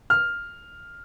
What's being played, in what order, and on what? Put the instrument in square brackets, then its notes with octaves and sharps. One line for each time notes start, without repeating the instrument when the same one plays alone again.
[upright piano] F6